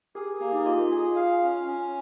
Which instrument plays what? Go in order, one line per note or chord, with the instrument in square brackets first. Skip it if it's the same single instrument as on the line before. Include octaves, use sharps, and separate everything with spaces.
[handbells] G4 A#4 [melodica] G#4
[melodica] A#3 [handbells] G4
[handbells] D#4
[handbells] F4 [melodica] D#5
[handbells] F4
[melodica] G#4
F5
C#4
C#4